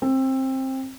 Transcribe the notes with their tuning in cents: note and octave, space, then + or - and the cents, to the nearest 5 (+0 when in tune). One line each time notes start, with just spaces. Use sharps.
C4 +20